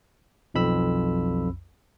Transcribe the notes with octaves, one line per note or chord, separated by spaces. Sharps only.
B1 F2 B5 E6